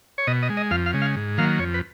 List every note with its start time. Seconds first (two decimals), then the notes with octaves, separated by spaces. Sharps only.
0.18 C#5
0.27 B2 D#5
0.43 D#5
0.50 G#3
0.57 D#5
0.71 F2 F5
0.86 F5
0.93 C#3 G#3
1.01 F5
1.16 G#2
1.37 D#3 F#3 A#3 F5
1.59 F2 C#5
1.74 B4